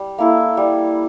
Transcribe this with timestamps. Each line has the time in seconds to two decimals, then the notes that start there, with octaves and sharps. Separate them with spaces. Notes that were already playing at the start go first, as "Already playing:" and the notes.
Already playing: G3
0.18 A#3 E4 A4
0.57 G3